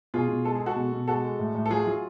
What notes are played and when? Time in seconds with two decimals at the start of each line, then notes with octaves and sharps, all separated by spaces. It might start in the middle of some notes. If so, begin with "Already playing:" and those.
0.14 B2 F4 G#4
0.29 B2
0.45 G#3 A4
0.55 G#4
0.61 G#3
0.66 F#4 A4
0.76 B2
0.93 B2
1.08 G#3 F#4 A4
1.24 G#3
1.39 A2
1.55 A2
1.66 A4
1.71 F#3 F4 G#4
1.86 F#3 F4